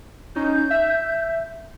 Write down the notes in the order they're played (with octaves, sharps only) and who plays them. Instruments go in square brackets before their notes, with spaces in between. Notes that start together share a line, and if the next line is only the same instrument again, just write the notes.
[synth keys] C#4 D#4 [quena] G6
[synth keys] E5